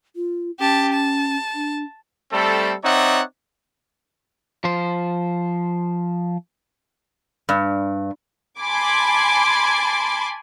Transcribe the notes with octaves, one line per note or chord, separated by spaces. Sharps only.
F4
C#4 G4 A5
A5
D4
G3 A3 C4 A4
C4 D#4 C#5 D5 E5 F#5
F3 C5
G2
G#5 A5 B5 C6 D6 G#6